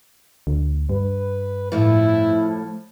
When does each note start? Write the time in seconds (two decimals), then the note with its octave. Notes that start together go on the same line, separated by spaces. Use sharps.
0.47 D2
0.89 G2 B4
1.72 A2 F3 E4